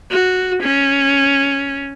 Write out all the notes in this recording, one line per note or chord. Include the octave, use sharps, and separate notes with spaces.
F#4
C#4